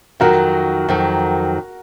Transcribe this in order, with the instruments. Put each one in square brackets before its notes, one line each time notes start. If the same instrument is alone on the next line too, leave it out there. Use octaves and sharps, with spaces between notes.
[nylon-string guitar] F2 D#3 F#3 [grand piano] F#4 A#4
[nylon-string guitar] F2 D#3 F#3